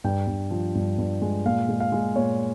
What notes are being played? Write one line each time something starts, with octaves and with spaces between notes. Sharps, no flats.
G2 G5
G2
F3
G2
G2
G#3
A#2 F5
G#3
F5
G#3
A#2 C#5